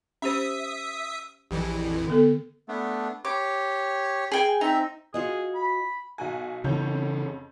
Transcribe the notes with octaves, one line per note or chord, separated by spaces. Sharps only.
C#4 G4 C5 E5 D#6
A#1 F2 E3 G4
D3 B3 A4
A3 B3 D4
G4 C#5 D6
G#4 G5 G#5
C4 D#4 E5
F4 F#4 G#4 D#5
B5
B1 F#4 G#5
F2 C#3 E3 C#4 G6